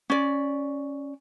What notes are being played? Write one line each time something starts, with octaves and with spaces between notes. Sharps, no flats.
C#4 D5